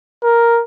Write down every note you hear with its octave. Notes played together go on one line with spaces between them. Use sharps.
A#4